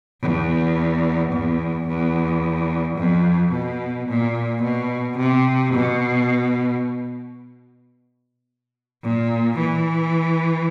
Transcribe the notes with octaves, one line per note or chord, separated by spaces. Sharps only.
E2
E2
E2
F2
B2
A#2
B2
C3
B2
A#2
E3